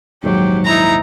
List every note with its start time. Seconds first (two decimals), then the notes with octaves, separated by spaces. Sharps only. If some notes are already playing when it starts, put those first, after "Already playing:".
0.24 A#1 D#2 G#2 F#3 G4
0.65 D#4 E4 A#5